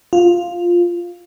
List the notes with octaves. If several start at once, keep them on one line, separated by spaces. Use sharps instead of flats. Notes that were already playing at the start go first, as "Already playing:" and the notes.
F4